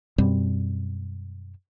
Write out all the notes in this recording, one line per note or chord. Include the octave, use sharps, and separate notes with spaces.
F#2 B2 G3 C4